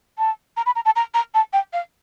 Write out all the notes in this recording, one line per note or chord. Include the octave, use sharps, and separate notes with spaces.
A5
A#5
B5
A#5
A5
A#5
A#5
A5
G5
F5